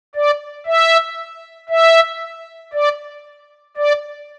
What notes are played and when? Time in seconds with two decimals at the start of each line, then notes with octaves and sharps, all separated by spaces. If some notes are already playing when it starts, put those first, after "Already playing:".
0.15 D5
0.66 E5
1.69 E5
2.73 D5
3.77 D5